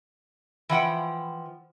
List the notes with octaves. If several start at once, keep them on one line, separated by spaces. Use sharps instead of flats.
E3 F3 F#5 G5